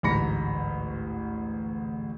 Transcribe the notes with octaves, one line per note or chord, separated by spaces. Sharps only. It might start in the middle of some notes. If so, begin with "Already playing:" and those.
A1 D2 G#2 B5 A#6 C#7